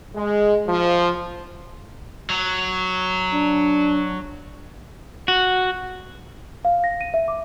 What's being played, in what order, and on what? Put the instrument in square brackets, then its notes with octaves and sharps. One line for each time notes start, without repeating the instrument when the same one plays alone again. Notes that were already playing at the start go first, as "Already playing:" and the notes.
[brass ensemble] G#3
F3
[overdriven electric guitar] F#3
[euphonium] D4
[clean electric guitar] F#4
[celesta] F5
A#6
D#7
E5
D6